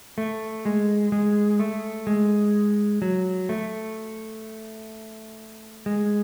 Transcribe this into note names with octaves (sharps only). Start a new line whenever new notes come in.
A3
G#3
G#3
A3
G#3
F#3
A3
G#3